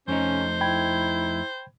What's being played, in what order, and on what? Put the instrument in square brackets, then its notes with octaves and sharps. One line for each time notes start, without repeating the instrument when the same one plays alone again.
[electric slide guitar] F2 A3 D#4 [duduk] C#4 [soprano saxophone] C5
[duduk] E4 [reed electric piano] G5 B5 G#6